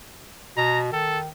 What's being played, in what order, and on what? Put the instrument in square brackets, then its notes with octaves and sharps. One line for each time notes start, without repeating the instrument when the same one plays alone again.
[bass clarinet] B2 [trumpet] A#5
[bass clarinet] D#3 [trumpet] A4